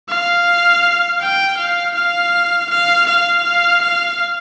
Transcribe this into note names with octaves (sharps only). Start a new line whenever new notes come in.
F5
G5
F5
F5
F5
F5
F5
F5